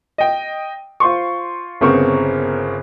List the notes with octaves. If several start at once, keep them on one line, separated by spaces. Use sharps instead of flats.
D#5 G5
F4 C5 C6 C#6
G1 C#3 B3 C4 A#4 C#6